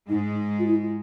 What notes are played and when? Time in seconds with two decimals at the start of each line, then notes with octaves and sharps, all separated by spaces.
0.09 G#2 G#3 D#4
0.59 F4
0.67 E4